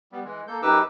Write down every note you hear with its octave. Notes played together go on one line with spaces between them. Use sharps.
G3 B3
E3 G#3
A#3 A4 G6
F#2 D#4 G4 B4 D6 E6